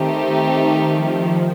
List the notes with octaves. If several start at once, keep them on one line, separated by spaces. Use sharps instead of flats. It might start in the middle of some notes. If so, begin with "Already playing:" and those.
Already playing: D#3 A3 C4 D#4 G4
D#3
F3